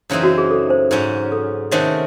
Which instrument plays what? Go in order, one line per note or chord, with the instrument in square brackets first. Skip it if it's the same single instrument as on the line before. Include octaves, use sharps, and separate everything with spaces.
[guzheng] F#2 C#3 E3 C4 D#4
[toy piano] F#4
G#4
A4
C5
[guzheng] G#2 F#3 C#4
[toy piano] A4
[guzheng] C3 D#3 A3 C#4 F#4 [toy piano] C5